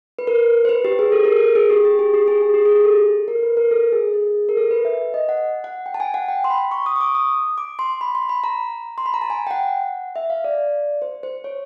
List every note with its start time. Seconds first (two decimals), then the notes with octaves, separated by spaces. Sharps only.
0.19 B4
0.27 A#4
0.65 C5
0.69 B4
0.84 G4
0.99 G#4
1.12 A4
1.25 A#4
1.37 A4
1.55 G#4
1.70 G4
1.85 G4
1.99 G#4
2.14 G4
2.28 G#4
2.42 G#4
2.54 G4
2.65 G#4
2.85 A4
3.28 A#4
3.43 B4
3.57 A#4
3.71 A4
3.92 G#4
4.14 G#4
4.49 A#4
4.57 A4
4.71 B4
4.85 E5
5.14 D#5
5.29 F#5
5.64 F#5
5.86 G5
5.94 A5
6.00 G#5
6.14 F#5
6.28 G5
6.44 C6
6.50 B5
6.71 C#6
6.86 D#6
6.96 C#6
7.01 D6
7.15 D#6
7.58 D6
7.79 C6
8.01 B5
8.15 C6
8.29 B5
8.44 A#5
8.98 C6
9.06 B5
9.14 A#5
9.21 A5
9.30 G#5
9.47 G5
9.51 F#5
10.16 E5
10.30 F5
10.44 D5
11.02 C5
11.23 C5
11.44 C#5